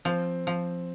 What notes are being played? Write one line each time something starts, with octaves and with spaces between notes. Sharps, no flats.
F3 C4
F3